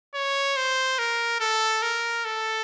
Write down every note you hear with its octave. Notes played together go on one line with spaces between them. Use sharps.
C#5
C5
A#4
A4
A#4
A4